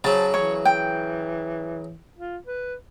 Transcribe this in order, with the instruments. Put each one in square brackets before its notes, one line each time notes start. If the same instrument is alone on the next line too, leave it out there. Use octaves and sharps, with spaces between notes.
[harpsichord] C#3 F#3 [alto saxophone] C5 [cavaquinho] A5
[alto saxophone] E3 [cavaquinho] C#5
[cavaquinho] G5
[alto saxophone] F4
B4